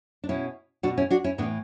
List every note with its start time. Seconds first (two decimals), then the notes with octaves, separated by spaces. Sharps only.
0.24 D4
0.29 B2 C#4 E4
0.83 B2 D4 F#4
0.97 C#4 E4
1.10 D4 F#4
1.24 C#4 E4
1.38 A2 B3 D4
1.42 E3